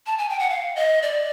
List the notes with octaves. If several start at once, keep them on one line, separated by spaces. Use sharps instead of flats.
A5
G#5
G5
F#5
F5
D#5
D5